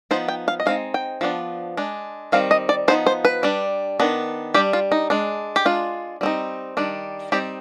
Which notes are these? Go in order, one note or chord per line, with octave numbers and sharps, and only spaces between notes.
F3 B3 D#4 C5
G5
F5
D#5
G#3 C4 D#4 F5
G5
F3 B3 D4
G#3 D4
D#3 G3 C4 F5
D#5
D5
F3 B3 D#4 C5
C5
B4
G3 D4
D#3 B3 D4
G3 D4 G4
F4
D#4
G#3 D4
G4
G#3 D4 F4
G3 C4 D#4
D#3 G3 D4
G3 C4 D#4 G4